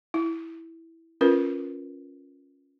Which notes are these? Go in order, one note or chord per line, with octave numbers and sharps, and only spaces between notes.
E4
C#4 F4 A#4 B4